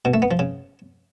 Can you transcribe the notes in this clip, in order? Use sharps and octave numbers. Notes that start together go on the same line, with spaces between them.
B2
A3
B3
F3
C#3